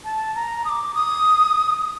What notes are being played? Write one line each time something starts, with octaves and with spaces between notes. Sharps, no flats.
A5
A#5
D#6
D6
D#6